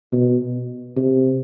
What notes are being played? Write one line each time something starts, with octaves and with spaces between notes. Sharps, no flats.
B2
C3